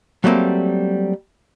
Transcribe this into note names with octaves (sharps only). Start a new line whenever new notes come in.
F#3 G3 A3 A#3 C4